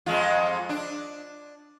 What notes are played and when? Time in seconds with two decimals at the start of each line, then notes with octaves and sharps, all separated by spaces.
0.06 F2 G#3 F4
0.69 D4